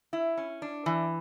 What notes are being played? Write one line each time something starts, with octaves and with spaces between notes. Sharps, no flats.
E4
C#4
D4
E3